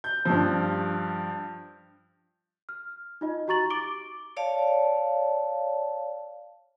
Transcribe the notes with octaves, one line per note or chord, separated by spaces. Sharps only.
G6
G2 F3
F6
D#4 F4 D#5
F#4 G4 A#5 C#6 A6 F#7
D6 D7 G7
C#5 D5 F5 A5